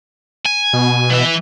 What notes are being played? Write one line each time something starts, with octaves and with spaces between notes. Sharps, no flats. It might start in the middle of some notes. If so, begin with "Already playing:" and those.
G#5
B2
E3 E5